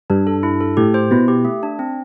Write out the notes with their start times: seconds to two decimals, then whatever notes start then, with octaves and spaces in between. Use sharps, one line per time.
0.10 G2 D4
0.27 A4
0.43 E4
0.60 A4
0.77 A2 G4
0.94 C5
1.11 B2 E4
1.28 G4
1.45 A3
1.63 D4
1.79 C4